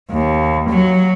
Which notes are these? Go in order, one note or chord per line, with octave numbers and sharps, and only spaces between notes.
D#2
F#3